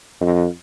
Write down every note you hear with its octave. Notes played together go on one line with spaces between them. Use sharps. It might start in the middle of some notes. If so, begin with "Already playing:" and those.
F2